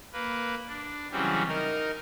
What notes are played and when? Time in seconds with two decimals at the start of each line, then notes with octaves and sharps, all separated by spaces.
0.13 A#3 B4
0.67 D4
1.12 C#3 E3 F#3 G3 C4 C#4
1.48 D#4 A#4